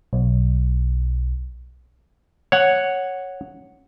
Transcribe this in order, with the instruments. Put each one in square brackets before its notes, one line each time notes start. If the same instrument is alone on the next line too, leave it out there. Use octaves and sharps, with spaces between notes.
[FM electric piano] B1
[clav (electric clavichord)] C#5 F#5